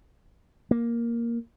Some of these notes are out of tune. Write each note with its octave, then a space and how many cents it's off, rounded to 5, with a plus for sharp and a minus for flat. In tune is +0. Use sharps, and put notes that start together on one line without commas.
A#3 +5